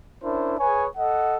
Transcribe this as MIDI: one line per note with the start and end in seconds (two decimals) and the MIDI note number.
0.22 0.54 61
0.22 0.54 62
0.22 0.54 64
0.22 0.54 70
0.22 0.54 72
0.59 0.86 68
0.59 0.86 71
0.59 0.86 73
0.59 0.86 80
0.97 1.37 69
0.97 1.37 75
0.97 1.37 78